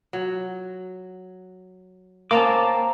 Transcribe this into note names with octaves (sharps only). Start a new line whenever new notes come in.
F#3
A#3 C4 C#4 A5 A#5 D6